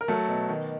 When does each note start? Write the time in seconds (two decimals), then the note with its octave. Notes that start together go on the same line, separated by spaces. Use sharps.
0.01 A#4
0.08 F#3 A3 A4
0.28 B2
0.48 D#3